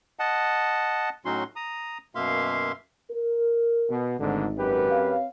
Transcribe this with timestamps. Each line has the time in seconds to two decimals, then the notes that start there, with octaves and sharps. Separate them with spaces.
0.19 D#5 F#5 A5
1.25 A2 F#3 C#4 D#4 F#4 C6
1.56 A#5 D#6
2.15 F#2 B2 A#3 E5 F5 C6
3.11 A#4
3.90 B2
4.20 G#1 D2 G#2 D3
4.59 F#2 G4 B4
4.91 C4 C#5 F5